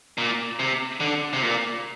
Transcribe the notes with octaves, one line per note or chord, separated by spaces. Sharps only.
A#2
C3
D3
C3
A#2